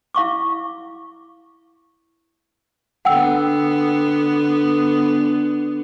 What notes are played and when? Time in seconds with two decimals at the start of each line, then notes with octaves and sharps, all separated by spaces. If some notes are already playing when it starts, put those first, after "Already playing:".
0.15 E4 F5 C#6 D6
3.05 D3 B3 F#5 G5 E6